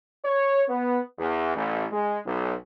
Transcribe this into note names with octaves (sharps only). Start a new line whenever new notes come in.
C#5
B3
E2
A1
G#3
B1